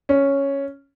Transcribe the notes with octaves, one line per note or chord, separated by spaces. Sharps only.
C#4